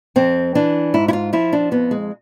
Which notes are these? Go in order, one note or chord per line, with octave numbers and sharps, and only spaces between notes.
F2 C4
E3 D4
G#2 E4
E4
F4
F3 E4
D4
F2 B3
G#3